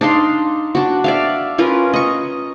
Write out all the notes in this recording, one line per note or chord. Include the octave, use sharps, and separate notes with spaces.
D4 D#4 F5 C6
D4 F#4
D5 E5 F5
C#4 F4 A#4 B4
D#5 C#6